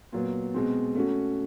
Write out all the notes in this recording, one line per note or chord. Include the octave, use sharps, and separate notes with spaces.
A#2 F#3 B3
B2 G#3 C4
A3 C#4 F#4